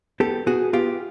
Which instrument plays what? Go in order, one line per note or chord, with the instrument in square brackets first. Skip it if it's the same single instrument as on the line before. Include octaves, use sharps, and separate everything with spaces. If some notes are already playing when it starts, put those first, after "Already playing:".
[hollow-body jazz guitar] B3 G4 A4
B3 F#4 G#4
B3 F4 G4